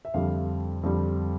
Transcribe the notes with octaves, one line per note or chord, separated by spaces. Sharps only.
E5
F2 D3 G3 F5
F2 D3 G3